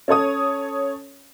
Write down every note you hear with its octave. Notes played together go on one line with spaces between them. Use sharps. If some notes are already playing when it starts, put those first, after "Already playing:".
C#4 A4 C#5 D#6